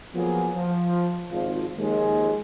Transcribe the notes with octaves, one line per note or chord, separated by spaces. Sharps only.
F3 F#3 A#3 B3 F4 G#4
F3
G#1 F3
D#2 F3 G#3